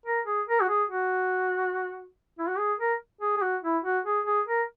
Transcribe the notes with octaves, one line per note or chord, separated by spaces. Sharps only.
A#4
G#4
A#4
F#4
G#4
F#4
E4
F#4
G#4
A#4
G#4
G#4
F#4
E4
F#4
G#4
G#4
A#4